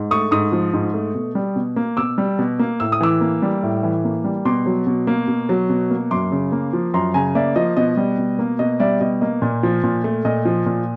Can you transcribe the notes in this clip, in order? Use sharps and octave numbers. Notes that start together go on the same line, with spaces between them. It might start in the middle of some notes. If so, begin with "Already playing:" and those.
Already playing: G#2
A3 C#6 D#6
G#2 C#6 D#6
F3
G#2
A3
B2
G3
B2
A#3
B2 D6 E6
G3
B2
A#3
A2 E6
D#6
E3 D6 E6
A#3
G3
A2
E3
A#3
G3
B2 C6 D6
F#3
B2
A#3
B2
F#3
B2
A#3
F#2 C6 D6
C#3
A#3
F3
F#2 A#5 C6
C#3 G#5 A#5
A#3 D5 E5
F3 D#5
B2 D#5
G3
B2
A#3
B2 D#5
G3 D5 E5
B2 D#5
A#3 D#5
A#2
F3
A#2
A3
A#2 D#5
F3
A#2